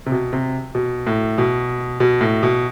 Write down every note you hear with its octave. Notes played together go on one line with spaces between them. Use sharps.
C3
B2
C3
B2
A2
B2
B2
A2
B2